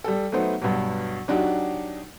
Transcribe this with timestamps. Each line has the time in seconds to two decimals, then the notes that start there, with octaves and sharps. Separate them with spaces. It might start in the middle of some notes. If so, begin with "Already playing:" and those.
0.04 G3 A4
0.32 F#3 A3 B3 D#4 C5
0.61 G2 B2 F#3
1.28 F#3 D4 D#4 F#4 G4